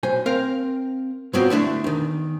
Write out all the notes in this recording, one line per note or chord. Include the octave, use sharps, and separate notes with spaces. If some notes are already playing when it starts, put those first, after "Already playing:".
B1 C5 G#5
C4 A#4 F5
G#2 F#3 B3 C4 F4
D3 A3 D4 E4
E2 D#3